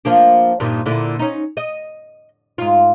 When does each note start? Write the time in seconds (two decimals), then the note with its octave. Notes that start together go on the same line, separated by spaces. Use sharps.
0.05 F3 A#3 D4
0.60 G2 A#2 D#3
0.86 A#2 D3 E4
1.19 C#4 D#4
1.57 D#5
2.58 G#2 F4